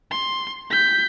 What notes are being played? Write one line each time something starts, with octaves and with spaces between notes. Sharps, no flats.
C6
G6 B6